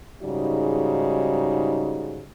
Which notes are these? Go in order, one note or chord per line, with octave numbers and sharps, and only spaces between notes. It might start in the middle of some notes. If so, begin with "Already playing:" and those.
G#2 C#3 G3 D#4 F#4